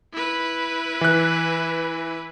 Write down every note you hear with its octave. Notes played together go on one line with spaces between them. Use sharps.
E4 B4
E3 F#6